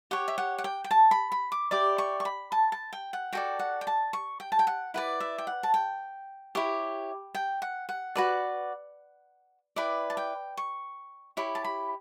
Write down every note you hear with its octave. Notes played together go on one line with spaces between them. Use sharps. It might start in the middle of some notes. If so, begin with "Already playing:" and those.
G4 C#5 F#5
E5
F#5
F#5
G5
G5
A5
B5
B5
D6
E4 G4 D5 D6
C#6
C#6
B5
A5
A5
G5
F#5
F#4 A4 D5 G5
F#5
G5
A5
C#6
G5
A5
G5
F#5
E4 B4 D5 F#5
E5
G5
F#5
A5
G5
E4 G4 C#5
G5
F#5
F#5
F#4 B4 D5
E4 B4 D5 G5
A5
G5
C#6
E4 G4 C#5 B5
A5
B5